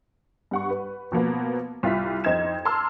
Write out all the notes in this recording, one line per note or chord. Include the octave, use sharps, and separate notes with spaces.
G2 F#5 C#6
B4
B2 F3 A#3 B3
C2 F4 E5 B6
F2 D#4 C5 G#6 E7
A5 A#5 C6 D6 E6 F6